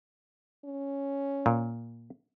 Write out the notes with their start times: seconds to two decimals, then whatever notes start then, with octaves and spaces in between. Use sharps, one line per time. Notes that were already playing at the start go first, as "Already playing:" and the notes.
0.65 C#4
1.46 A#2